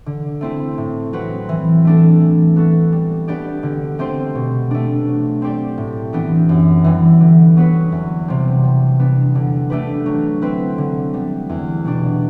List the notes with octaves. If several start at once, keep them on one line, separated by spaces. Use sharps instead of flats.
D3
A3 C4 E4
A2
F#3 C4 F#4 B4
E3
A3 D4 A4
E3
B3 F#4 A4
G3
B3 D4 G4 D5
D3
A3 C4 G4 C5
B2
A3 D4
F#3
C4 G4 D5
A2
E3 B3 D4 G4
F#2
E3 G3
D3
F#3 B3 F#4 B4
E2
C3 G3 C4
G3
B3 D4
D3
A3 D4 G4 B4
F#3
C4 E4 B4
D3
G3 B3
E2
B2 G3 D4